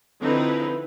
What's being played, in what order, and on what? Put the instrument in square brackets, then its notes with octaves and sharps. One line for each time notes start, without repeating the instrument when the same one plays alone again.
[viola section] D3 F3 C4 D#4 E4 B4